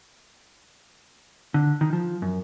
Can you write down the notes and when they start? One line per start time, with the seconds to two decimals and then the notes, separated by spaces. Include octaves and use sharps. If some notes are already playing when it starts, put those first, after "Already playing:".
1.54 D3
1.81 D#3
1.93 F3
2.22 F#2